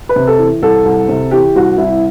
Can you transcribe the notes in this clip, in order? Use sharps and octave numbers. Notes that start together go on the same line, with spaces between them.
B4
C3
A4
E3
C2 A4
C2
C3
E3 G4
C2 F#4
C2 E4